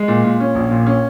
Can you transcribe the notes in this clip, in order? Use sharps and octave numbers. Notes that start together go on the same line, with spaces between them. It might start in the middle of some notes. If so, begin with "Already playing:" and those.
Already playing: G#3
A#2
A#2
C#4
A#1
A#2
C#4